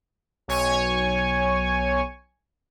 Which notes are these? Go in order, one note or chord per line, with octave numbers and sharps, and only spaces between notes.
B1 C#5 G#5 C#6